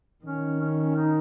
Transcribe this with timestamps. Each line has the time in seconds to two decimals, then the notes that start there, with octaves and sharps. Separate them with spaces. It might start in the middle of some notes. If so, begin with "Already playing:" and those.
0.24 D#3 C#4
0.60 C#4
0.96 D#4